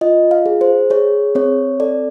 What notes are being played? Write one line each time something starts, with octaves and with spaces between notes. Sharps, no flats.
F4 D#5
F5
G#4
C5
G#4 C#5
C4 C#5
A4 D5